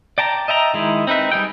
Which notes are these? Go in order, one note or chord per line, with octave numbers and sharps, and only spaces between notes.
D5 G5 A5 A#5
D#5 E5 G5 A#5
D#3 G#3 E4
C4 D#4 B4 E5
G3 D#4 G#4 G5